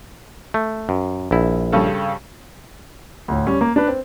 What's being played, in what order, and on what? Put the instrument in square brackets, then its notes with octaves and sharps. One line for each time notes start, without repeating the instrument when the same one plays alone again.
[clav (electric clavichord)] A3
F#2
A#1 E4
[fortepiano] G2 C#3 A4
[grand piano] D2 A2
G3 C#4
A#3
D4 B4
C4